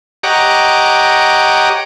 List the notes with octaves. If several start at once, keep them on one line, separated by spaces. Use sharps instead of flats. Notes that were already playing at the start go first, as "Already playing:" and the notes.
G4 C#5 D#5 F#5 A#5 D6